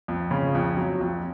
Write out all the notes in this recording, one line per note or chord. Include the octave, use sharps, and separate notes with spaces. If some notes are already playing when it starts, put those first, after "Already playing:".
F2
C#3
F2
F#3
F2